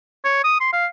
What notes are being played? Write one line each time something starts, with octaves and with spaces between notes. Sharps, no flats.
C#5
D#6
C6
F5